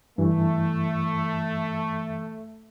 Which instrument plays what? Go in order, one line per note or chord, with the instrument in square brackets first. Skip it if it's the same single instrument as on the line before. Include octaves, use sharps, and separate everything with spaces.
[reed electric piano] G2 E3 [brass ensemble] A3